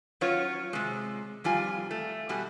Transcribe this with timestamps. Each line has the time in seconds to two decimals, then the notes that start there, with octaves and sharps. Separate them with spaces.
0.21 F#3 C#4 F4 C#5
0.73 C3 G#3
1.44 F2 G3 F4 G#5
1.91 A3
2.29 B2 G3 F#4 G#5